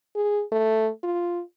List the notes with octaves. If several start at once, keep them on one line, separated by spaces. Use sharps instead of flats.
G#4
A3
F4